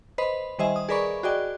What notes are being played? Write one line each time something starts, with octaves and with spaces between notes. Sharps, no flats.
B4 C5 D#5 B5
D#3 G3 C5 D#5 E5 G#5
D#6
G#4 A#4 B4 D5 B5 C#6
F#4 G#4 D5 D#5 G5